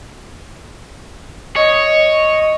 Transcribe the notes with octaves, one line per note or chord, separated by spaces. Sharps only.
C#5 D#5